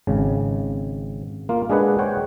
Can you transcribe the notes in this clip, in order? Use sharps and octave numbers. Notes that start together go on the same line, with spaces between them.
G#1 C#3
A#3 F4
G#3 D4 G#4 B4 F#5
C5 C#5 F#5 G5